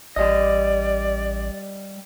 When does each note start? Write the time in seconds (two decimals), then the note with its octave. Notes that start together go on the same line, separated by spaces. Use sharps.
0.16 A1 G3 D5 D#5